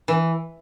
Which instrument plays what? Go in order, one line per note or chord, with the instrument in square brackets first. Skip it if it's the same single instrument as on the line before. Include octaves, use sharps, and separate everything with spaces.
[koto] E3